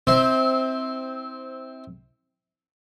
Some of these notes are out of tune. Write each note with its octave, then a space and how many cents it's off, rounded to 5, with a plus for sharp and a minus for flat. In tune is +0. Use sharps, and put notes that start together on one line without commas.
C4 +0 E4 -30 C5 +5